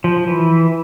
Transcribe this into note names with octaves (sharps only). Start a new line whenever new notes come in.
F3
E3